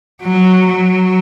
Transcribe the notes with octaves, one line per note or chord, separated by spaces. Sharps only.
F#3
F#3